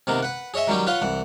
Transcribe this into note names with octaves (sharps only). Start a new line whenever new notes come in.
C3 D#3 A#3 B3 A#4
B4 F#5
G#4 C#5 D#5 E5 G#5
D#3 F#3 G3 C#4 G4
F4 B4 C#5 F5 F#5 C6
C2 E3 F#5